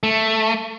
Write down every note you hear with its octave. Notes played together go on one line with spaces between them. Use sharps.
A3